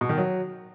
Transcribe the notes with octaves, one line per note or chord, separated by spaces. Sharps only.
B2
D#3
F#3